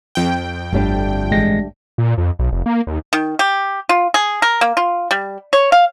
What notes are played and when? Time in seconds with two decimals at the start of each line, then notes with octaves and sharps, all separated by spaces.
0.15 F2 G5
0.73 G1 D2 G3 D4
1.31 A1 G#3 A#6
1.98 A#2
2.18 F2
2.39 B1
2.52 F1
2.66 A#3
2.87 D#2
3.13 D#3
3.39 G4
3.89 F4
4.14 G#4
4.42 A#4
4.61 A#3
4.77 F4
5.11 G3
5.53 C#5
5.72 F5